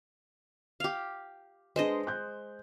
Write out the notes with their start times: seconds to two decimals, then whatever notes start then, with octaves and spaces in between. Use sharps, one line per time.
0.80 G4 F5
1.76 G#3 D4 G#4 B4 C5 D#5
2.07 F#6 G6